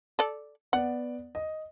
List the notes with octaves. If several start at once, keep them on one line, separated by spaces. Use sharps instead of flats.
A4 D5
B3 D5 F#5
D#5